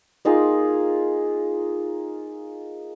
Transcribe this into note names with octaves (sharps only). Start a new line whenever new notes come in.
A#3 D#4 F4 G#4